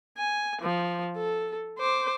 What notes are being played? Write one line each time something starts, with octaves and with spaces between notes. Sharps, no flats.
G#5
F3
A4
C5 D6